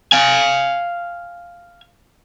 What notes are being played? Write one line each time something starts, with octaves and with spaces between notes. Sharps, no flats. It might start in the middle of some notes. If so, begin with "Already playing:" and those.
F5 G#5